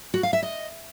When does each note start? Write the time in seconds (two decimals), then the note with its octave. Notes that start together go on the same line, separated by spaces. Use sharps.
0.14 F#4
0.23 F5
0.33 E5
0.43 D#5